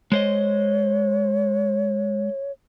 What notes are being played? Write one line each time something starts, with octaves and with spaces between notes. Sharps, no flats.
G#3 C5 C#5 D#5